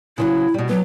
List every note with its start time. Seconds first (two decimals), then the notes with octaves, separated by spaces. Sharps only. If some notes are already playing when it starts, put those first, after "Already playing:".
0.18 C#3 F3 F#3 E4
0.54 B2 G3
0.69 F#3 B3